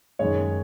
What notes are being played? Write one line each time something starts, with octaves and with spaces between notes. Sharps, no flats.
F#2 D#3 G#3 C#5